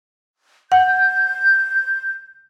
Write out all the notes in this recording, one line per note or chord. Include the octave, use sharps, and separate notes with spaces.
F#5 G6